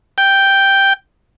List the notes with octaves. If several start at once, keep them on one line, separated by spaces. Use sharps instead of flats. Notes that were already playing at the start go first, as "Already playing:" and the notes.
G5